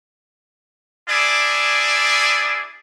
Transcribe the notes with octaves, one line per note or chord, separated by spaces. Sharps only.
D4 E4 G#4 D5